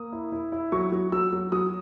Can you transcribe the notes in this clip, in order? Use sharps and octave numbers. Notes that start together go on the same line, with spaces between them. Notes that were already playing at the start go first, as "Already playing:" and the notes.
Already playing: A#3 D#6
E4
E4
E4
F#3 C#6
F#3
F#3 E6
F#3
F#3 D#6